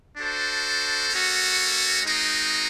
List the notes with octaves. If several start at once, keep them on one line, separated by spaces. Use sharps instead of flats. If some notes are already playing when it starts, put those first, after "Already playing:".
D4 F#4 A4 C5
A#3 C#4 F#4 A4
G#3 C4 D#4 F#4